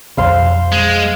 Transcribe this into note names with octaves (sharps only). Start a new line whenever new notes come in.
B1 F2 C5 F5 C6
G#3